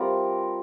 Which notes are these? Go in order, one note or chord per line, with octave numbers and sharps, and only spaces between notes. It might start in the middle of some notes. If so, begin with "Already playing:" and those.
Already playing: G3 C4 F4 A#4